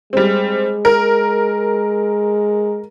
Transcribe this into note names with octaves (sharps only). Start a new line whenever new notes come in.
G3 G#3 C4
A#4